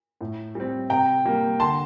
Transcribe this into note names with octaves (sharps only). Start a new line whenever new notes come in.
A2
G3 C4
C3 G5 A#5
G3 A#3
D3 A5 C6